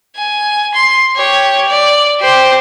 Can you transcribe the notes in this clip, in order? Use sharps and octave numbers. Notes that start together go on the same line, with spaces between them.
G#5
C6
G4 C#5
D5
G4 C5